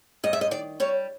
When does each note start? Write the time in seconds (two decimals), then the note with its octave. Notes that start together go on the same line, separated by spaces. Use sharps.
0.24 G2 D#5
0.33 E5
0.41 D#5
0.51 D#3 D5
0.80 G3 C#5